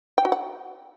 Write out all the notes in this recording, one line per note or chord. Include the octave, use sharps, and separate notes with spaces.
G5
F#4
F#5